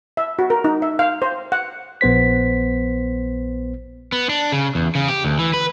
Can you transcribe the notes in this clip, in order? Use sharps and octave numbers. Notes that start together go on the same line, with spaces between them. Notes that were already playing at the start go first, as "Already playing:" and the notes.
E5
F#4
A#4
D#4
E5
F5
C5
F#5
A#1 B3 C5 B6
B3
D4
C#3
E2
C#3
G4
D2
E3
B4